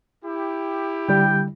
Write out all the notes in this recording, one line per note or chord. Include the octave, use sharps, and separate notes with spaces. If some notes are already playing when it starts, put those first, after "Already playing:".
E4 G4
D3 G3 G5